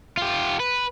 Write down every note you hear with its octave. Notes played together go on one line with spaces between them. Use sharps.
F4 G4
B4